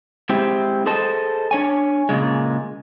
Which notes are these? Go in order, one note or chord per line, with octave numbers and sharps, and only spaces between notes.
G#3 C4 E4 G4
G#4 A4 C5 D#5 A5
D4 C#5 G#5
A#2 C#3 G#3